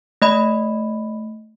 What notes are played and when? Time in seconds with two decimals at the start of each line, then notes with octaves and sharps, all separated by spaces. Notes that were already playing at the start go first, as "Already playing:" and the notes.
0.22 A3 D#5 B5